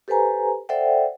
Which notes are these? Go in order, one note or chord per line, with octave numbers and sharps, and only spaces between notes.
G4 A4 B4 C5 G#5 A#5
A4 C5 D5 E5 F#5 G5